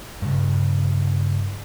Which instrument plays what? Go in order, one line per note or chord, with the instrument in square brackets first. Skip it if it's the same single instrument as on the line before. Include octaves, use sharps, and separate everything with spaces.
[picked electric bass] G2 C#3